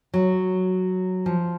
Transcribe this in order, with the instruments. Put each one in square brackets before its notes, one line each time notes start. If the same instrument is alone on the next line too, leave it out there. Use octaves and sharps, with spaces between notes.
[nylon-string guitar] F#3
F3